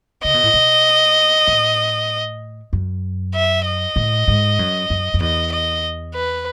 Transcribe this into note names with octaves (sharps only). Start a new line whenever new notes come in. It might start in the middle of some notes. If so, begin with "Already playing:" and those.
C#3 D#5
B2
A2
B2
A2
F#2
E5
D#5
A2
G#2
F#2
F#2
F#2
E2 D#5
D#5
B4